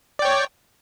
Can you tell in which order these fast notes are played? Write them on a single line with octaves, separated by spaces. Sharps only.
D5 G5 C#5